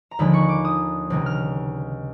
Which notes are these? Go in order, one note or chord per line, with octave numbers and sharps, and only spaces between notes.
A#5
D#2 D3 F3 G#3 B5
C#6
D6
D#6
C#2 C3 D#3 G#3
F6